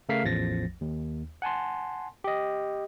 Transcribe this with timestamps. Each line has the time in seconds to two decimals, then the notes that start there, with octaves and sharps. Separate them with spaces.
0.09 C#3 A3 A#4 F5 B6 C7
0.24 A1 E2 F3 A6 A#6
0.81 D#2
1.42 F#5 G#5 A5 C6
2.24 G4 D#5